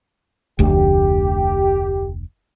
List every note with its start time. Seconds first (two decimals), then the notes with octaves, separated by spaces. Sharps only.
0.59 F1 D2 G4